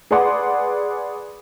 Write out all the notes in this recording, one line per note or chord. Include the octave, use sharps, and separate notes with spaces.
G#4 B4 D5 F#5 C6 D6